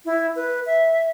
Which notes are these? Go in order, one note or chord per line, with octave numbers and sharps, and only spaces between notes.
E4
B4
E5